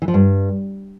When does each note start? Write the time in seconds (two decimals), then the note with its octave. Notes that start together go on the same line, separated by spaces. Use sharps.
0.02 E3
0.08 F3
0.14 G2